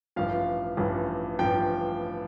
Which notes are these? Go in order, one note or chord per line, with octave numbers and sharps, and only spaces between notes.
A1 G2 F3 F5
A1 G2 F3
A1 G2 F3 G5